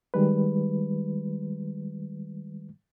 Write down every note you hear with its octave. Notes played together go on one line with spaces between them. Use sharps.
D#3 G3 G#3 B4